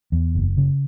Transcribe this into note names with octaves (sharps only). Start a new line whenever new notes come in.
E2
F#1
C#3